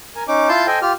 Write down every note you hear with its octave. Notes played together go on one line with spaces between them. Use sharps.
A#4 G#5
C#4 D#4 D6
E4 F4 A5 C6 G6
A4 C5 D#5 G5 G#5
F4 G4 F6